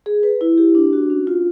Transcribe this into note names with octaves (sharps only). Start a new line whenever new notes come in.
G#4
B4
E4
G4
D4
F#4
C#4
F4